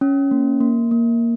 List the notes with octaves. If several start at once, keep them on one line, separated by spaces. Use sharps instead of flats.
C#4
A#3
A#3
A#3